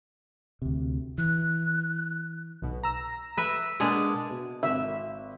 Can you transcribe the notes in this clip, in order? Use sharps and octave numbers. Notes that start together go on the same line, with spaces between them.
D2 C3
E3 F#6
B1 B2
A#5 E6
B4 E5
B2 G#3 A#3 D4 G#4
B2
G#1 E5